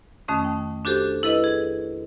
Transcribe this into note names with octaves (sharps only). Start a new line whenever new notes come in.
F2 D#3 A3 C#4 D#6
G5
D4 F#4 G4 A4 C5
E4 A4 B4 D#5
G#4